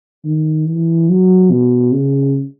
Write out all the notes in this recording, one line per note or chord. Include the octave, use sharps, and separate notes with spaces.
D#3
E3
F#3
B2
C#3